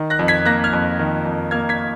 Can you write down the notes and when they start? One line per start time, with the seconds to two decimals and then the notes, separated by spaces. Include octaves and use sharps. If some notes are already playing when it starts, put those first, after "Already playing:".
Already playing: D#3
0.10 F#6 A#6
0.19 F2
0.28 G#6 B6
0.45 A#3 F#6 A#6
0.64 F6 G#6
0.73 F2
0.99 D#3
1.26 F2
1.51 A#3 F6 G#6
1.69 G#6 B6